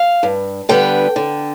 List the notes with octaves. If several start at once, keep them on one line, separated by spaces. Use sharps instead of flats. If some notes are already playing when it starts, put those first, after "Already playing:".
Already playing: F5
G2
D3 G3 B3 G5
D3